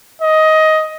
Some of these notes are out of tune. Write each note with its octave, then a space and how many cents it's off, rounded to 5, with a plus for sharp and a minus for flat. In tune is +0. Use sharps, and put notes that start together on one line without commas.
D#5 +15